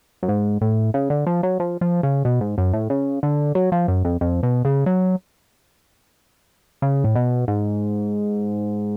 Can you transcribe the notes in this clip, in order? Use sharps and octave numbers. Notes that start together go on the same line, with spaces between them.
F#2
G#2
A2
C#3
D3
F3
F#3
F3
F3
C#3
B2
G#2
F#2
A2
C#3
D3
F#3
F3
F#2
F2
F2
B2
C#3
F#3
C#3
A2
B2
G#2